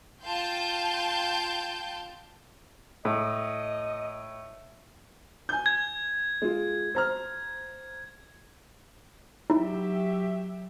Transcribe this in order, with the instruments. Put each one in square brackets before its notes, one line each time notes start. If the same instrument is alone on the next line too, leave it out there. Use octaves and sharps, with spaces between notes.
[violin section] F4 G5 A5 C6 G6
[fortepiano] A2 [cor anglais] D#5
[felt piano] G#5 G6
[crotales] G#6
[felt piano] G#3 F4
C5 A#5 F6
[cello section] F#3 G4 E5 [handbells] D#4 E4